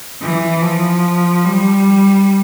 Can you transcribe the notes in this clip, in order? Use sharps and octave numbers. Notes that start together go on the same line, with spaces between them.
E3
F3
G3